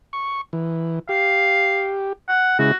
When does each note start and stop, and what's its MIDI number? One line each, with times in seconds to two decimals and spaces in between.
0.13 0.41 85
0.53 0.99 52
1.09 2.13 67
1.09 1.90 77
2.28 2.54 78
2.59 2.71 49
2.59 2.71 56
2.59 2.71 64
2.59 2.76 66